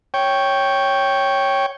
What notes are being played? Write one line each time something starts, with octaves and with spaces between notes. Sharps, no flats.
C#5 G5